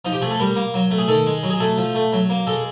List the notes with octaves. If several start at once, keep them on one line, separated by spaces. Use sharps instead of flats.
F3 D#4
G4
A3 G#4
A4
G3 A#4
A#3
F#3
A3
G#4
D#3 A4
G#3
F#3
G#4
A3 A4
F3
A3
F#3
A#3
G#3 A4